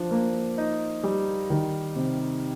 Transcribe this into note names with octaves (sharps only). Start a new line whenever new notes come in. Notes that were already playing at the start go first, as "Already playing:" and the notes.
Already playing: F3 D4
A#3
D#4
G3
D#3
C3